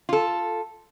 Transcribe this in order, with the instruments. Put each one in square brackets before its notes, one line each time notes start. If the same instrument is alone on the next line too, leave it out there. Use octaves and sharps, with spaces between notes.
[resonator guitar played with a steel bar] F4 A4